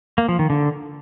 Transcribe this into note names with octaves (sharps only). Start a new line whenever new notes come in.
A#3
F3
D#3
D3